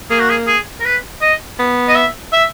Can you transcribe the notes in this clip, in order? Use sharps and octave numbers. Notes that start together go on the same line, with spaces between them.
A#3 G#4
F#4
G#4
G#4
A#4
B4
D#5
B3
D#5
E5
E5